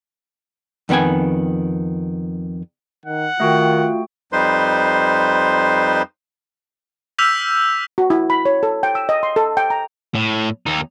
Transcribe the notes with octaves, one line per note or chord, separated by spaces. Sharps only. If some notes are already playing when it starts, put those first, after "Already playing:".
F2 D#3 B3 G5 G#5
D#3 F#5
D#3 A3 F4 F#4 G5
F2 G3 D#4 B4 C5 C6
D6 E6 F6 G6 B6 F7
F#4
E4
B5
C#5
A4
G5
E6
D#5
C6
A4
G5
A#5
A2
D#2 D#4